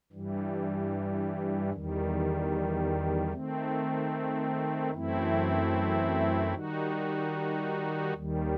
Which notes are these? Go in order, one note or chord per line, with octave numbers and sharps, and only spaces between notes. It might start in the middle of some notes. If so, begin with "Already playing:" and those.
G2 E3 G3
E2 D#3 G3
D#3 A3 C4
F#2 E3 A3 C4 E4
D#3 G3 D#4 F#4
D#2 D#3 G3